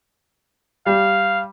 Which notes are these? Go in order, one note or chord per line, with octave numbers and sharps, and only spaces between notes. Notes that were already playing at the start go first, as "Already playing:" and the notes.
G3 F5